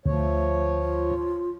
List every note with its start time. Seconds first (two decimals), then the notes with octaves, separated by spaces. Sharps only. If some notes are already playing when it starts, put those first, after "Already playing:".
0.06 D2 F3 A3 C#5
0.82 F4